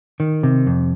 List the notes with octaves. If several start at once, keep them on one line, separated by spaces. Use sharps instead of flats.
D#3
C3
F2